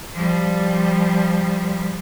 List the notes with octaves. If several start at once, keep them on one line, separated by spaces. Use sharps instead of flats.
F3 G3